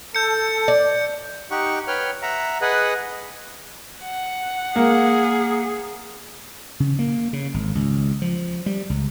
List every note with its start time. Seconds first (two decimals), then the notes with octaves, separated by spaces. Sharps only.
0.15 A4 G6 C#7
0.68 D5
1.51 D#4 G4 F#5 C#6
1.88 B4 C#5 G5 F6
2.22 E5 F#5 A#5
2.61 G#4 B4 D#5 F#5
4.02 F#5
4.76 A#3 G#4
6.80 C#3
6.99 A#3
7.33 C#3
7.54 G#1
7.75 C#2
8.22 F3
8.66 G3
8.90 C#2